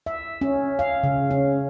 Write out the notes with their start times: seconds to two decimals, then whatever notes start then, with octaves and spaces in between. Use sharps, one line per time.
0.06 E5
0.41 C#4
0.79 F5
1.03 C#3
1.31 C#4